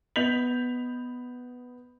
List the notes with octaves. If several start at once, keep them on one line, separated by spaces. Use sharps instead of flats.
B3 D#5 G6 B6 F7 F#7